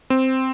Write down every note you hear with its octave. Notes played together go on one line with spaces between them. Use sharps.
C4